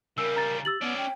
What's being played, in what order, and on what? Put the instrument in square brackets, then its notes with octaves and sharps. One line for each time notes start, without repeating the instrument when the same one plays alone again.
[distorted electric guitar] C#3 G3 [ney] A#4 [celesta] E6
[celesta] A#5 A6
[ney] G4 [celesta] E6 A6 F#7
[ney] B3 [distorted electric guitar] C#4 D5
[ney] G5